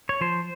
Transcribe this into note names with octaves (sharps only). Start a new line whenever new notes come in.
C#5
F3 C5